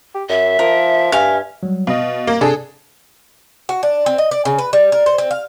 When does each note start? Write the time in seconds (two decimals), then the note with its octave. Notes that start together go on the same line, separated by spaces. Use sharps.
0.15 G4
0.29 F#2 E5
0.59 F3 A#4
1.12 G2 F5 G#5
1.63 F#3 G3
1.87 B2 D#5 F5
2.27 A#3
2.41 C3 D4 G#4 A4
3.69 F#4
3.83 D4
4.06 C4
4.18 D#5
4.31 D5
4.45 C#3
4.58 B4
4.73 G3
4.92 A#4
5.06 C5
5.18 C4
5.31 F5